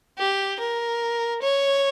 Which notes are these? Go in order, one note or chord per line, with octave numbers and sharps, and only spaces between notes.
G4
A#4
C#5